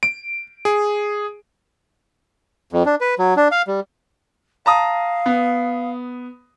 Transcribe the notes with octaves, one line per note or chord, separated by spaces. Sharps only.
D7
G#4
F2
D4
B4
F#3
D4
F5
G3
F5 A5 A#5 D#6
B3